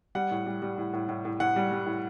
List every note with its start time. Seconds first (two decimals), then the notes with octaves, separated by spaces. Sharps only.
0.15 G3 F#5
0.31 A2
0.46 G3
0.62 G3
0.78 A2
0.93 A2
1.09 A2
1.25 A2
1.40 A2 F#5
1.56 G3
1.72 G3
1.86 A2